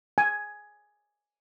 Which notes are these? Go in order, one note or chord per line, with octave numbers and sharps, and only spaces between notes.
G#5